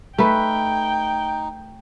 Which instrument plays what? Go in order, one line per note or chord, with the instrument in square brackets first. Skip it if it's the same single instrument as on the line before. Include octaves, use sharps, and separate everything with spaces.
[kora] A3 B4 [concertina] D#4 [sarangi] G5